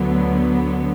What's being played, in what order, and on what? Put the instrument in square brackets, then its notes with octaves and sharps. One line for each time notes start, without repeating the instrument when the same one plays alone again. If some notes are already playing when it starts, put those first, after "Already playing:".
Already playing: [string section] D2 D3 F#3 B3